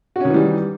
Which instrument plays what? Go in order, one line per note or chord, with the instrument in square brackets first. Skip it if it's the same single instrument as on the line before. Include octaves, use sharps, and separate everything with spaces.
[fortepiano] F#4
C#4
D#3
E3
G3